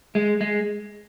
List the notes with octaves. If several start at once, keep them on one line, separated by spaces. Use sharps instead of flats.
G#3
G#3